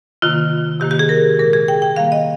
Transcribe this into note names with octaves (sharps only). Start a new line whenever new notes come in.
C3 D#3 A#3 F4
C3 D#3 A#3 G4
G4
G#4
A#4
A#2 G#3 A#4
G#4
G5
G5
D#3 G3 A#3 F5
D#5